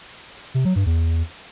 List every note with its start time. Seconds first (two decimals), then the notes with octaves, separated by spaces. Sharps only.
0.55 C3
0.65 F#3
0.76 G2
0.86 E2